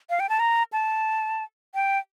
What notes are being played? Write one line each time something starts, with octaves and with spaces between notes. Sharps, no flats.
F5
G5
A5
A#5
A5
G5